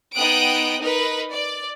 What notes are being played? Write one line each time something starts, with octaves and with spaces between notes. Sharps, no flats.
B3 D#4 G5 D#6 F#6 D7
D#4 A#4 B4
D5